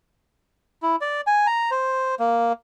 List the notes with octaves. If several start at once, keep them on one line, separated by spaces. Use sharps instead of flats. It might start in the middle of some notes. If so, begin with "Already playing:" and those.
E4
D5
G#5
A#5
C5
A#3